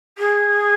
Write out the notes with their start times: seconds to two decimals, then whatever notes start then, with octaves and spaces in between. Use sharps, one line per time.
0.18 G#4